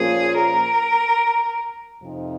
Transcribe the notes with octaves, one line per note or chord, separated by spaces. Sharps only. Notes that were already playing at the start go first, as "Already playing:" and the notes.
Already playing: A#2 F3 A#3 C#4 F4 G#4
A#4
F2 C3 F3 C4 D#4